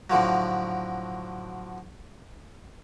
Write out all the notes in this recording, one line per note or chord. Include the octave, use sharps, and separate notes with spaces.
A2 D3 F3 F#3